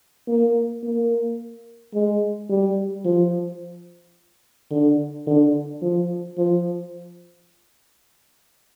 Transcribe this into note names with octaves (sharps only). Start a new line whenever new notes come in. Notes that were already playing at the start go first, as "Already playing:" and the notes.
A#3
A#3
G#3
G3
F3
D3
D3
F3
F3